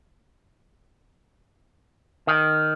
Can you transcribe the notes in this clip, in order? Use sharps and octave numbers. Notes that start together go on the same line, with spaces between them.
D#3